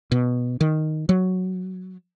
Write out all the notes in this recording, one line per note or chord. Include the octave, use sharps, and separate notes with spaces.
B2
D#3
F#3